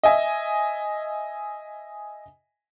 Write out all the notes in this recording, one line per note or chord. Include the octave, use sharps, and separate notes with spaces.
D#5 E5 G#5